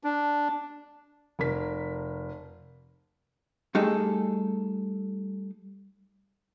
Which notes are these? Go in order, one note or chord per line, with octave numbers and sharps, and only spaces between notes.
D4
F1 A#4 B6
G3 A3 D#4 G#4 A4